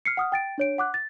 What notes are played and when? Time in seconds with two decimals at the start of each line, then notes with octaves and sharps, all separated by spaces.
0.05 F6 C7 C#7
0.17 F#5 D#6 F6
0.32 G5 A6 D7
0.58 D4 C#5 D7
0.78 F#5 D6 F#6
0.94 A6